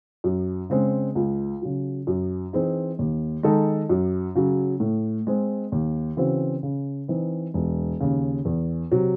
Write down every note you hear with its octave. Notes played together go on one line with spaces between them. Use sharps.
F#2
C#3 G#3 C4
C#2
C#3 F#3
F#2
E3 C4 D#4 G#4
D#2
D#3 G#3 D#4 A4
F#2
C#3 F#3
A2
G#3 C4
D#2
C#3 E3 C4 F#4
C#3
E3 C4 D#4
E1
D#2 C#3
E2
C3 F#3